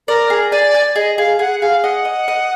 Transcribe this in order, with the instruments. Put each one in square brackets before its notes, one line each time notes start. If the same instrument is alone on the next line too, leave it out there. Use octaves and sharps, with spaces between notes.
[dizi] A#4 [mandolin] D5
[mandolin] G#4
[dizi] D5 [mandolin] G#5
[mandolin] G#5
[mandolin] G#4 [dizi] D#5
[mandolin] G#4 [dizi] F5
[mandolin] G#4 [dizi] F#5
[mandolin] G#4 [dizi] F5
[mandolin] D#5 [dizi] F#5
[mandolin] D#5
D#5